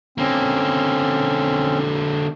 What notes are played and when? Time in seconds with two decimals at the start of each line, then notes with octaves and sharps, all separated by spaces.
0.18 D3 A#3 C4 C#4